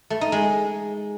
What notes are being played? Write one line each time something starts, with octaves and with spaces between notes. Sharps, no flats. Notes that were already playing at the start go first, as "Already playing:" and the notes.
A3
D#4
G#3